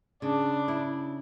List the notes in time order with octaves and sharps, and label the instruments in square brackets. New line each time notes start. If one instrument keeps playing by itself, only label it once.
[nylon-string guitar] C#3 [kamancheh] D4
[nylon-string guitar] E4